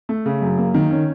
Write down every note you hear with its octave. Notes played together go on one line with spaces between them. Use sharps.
A3
C#3
F#2
A#3
D#3
C#4